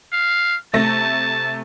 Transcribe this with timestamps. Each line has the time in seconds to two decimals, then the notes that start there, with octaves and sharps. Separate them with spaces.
0.12 F5
0.73 C3 A3 A5 A#6